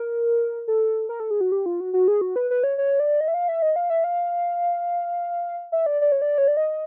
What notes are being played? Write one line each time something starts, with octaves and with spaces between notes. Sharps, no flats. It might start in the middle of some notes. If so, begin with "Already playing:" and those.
Already playing: A#4
A4
A#4
A4
G#4
F#4
G4
F4
F#4
F#4
G#4
F#4
B4
B4
C#5
C#5
D5
D#5
E5
F5
E5
D#5
F5
E5
F5
E5
D5
D5
C#5
D5
C#5
D5
D#5